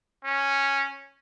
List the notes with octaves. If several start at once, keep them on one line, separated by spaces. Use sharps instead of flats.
C#4